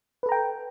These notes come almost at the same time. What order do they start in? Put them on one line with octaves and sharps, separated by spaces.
B4 A4 A#5 G5